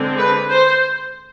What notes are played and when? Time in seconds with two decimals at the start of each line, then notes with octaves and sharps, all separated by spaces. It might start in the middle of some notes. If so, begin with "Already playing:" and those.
Already playing: D3 G#3 C4
0.18 B4
0.50 C5